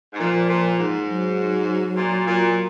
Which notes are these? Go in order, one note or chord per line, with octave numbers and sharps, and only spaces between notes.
G#2
A#2 F3
A#2
G#2
F#3
A#2
A#2